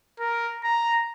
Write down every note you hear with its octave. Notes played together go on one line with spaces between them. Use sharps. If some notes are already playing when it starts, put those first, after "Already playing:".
A#4
A#5